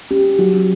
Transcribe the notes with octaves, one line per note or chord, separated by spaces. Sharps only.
C#4 G4
F#3 F#4